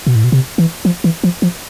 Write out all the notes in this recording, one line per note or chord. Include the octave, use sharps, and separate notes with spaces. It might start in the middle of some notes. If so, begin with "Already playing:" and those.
B2
A2
B2
C3
E3
F3
E3
F3
F3